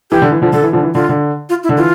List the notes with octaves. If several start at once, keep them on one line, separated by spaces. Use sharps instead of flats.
E3 G4
D3
E3
D3 F3
D3 A4
E3
D3 F3
E3
D3 F4
D3
F4
E4
D3
E3 F4